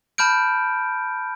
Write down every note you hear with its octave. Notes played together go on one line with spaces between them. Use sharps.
A5 B5 F6 G6 D7